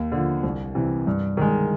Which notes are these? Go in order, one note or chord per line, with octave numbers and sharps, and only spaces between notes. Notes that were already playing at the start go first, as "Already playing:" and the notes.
Already playing: D#2
D3 F3
C2
C3 E3
G2
D#3 G#3